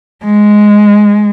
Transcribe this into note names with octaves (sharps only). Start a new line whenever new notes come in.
G#3